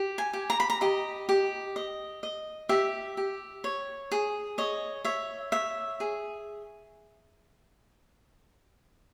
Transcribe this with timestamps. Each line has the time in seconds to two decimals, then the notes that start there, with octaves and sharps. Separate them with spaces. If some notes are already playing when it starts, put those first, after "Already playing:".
Already playing: G4
0.18 G#5
0.33 G4
0.50 A#5
0.60 B5
0.70 A#5
0.81 G4 D#5
1.29 G4
1.76 D#5
2.23 D#5
2.69 G4 E5
3.17 G4
3.64 C#5
4.12 G#4
4.58 C#5 D#5
5.05 C#5 E5
5.52 C#5 E5
6.00 G#4